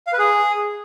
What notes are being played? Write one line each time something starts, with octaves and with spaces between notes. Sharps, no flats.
F5
B4
G#4